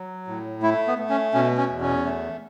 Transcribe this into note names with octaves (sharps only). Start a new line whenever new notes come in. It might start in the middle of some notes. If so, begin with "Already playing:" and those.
Already playing: F#3
A2
A3 E4
B3
A3
C#4
B2 C#4
C#4
E2
C#4
A3